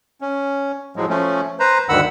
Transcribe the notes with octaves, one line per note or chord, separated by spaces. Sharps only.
C#4
A2 F3 F#3 G#3
F3 A3 C#4
B4 C5 A#5
D2 G2 D#3 F#5 B5 E6